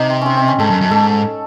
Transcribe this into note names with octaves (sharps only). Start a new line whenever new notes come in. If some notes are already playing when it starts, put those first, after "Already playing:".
Already playing: C3 D#4
C4
C4 C#4
C4
C#4
G#2 A4
F#2
F#2
G#2 A4